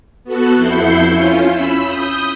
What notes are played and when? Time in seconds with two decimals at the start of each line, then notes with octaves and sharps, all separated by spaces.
0.24 B3 F#4 A4 F#6
0.55 F2 E4 G6 C7 C#7
1.09 C#4 F4
1.52 B5 E6
1.83 D#6 G6